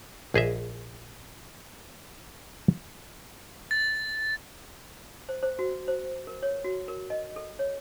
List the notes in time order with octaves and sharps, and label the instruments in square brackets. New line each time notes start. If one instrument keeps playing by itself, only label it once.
[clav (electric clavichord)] A#1 G#4 D#5 E5
[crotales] A6
[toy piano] C5
C5
F#4
C5
A#4
C#5
F#4
A#4
D#5
A4
C#5